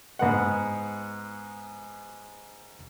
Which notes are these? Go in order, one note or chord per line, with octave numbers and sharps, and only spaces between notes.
G#2 B3 F#5